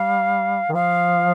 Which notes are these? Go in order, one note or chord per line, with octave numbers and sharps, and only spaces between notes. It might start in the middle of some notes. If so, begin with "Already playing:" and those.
Already playing: G3 F5
D#3
F3 F5